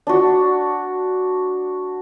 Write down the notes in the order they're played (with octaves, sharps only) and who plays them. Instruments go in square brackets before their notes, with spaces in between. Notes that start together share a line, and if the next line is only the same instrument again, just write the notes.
[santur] D4 F#4